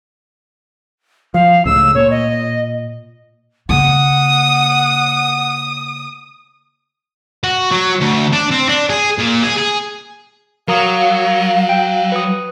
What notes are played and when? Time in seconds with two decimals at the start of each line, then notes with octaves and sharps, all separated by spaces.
1.34 F3 F5
1.65 C#2 A2 C#3 E6
1.95 A#2 C#5
2.11 D#5
3.69 C#3 A#3 F#5 D#6
7.44 F#4
7.72 F#3
8.01 D2
8.33 D4
8.51 C4
8.69 D4
8.90 G#4
9.18 A#2
9.43 G#4
9.58 G#4
10.68 F#3 A#4 F5 A#5 D#6
11.69 G5
12.12 B4 D#6